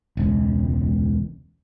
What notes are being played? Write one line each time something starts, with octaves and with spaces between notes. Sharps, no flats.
E1 C#2